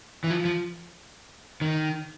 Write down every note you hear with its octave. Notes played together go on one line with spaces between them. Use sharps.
E3
F3
F3
D#3